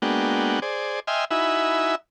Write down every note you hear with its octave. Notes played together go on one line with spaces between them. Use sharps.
G#3 A#3 B3 D4 F#4 G5
G#4 C5 D5
D#5 E5 G5 G#5 C6 F6
D#4 E4 F#4 E5 G#5 B5